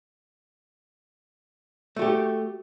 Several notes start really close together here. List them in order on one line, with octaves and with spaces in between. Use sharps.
A3 F#4 G4